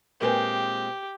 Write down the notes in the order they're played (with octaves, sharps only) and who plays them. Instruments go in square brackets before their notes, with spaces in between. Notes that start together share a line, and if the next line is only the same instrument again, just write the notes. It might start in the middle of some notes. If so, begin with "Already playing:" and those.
[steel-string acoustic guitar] A#2 G#3 C4 [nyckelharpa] G4 [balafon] A#4 B4 G#5